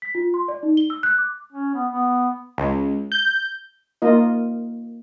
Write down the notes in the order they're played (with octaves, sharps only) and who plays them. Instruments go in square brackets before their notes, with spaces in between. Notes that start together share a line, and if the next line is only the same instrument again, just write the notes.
[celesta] B6
F4
C6
D5
D#4
G7
E6
F#6
D6
[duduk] C#4
B3
B3
[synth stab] C#2
G6
[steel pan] A#3 F4 D#5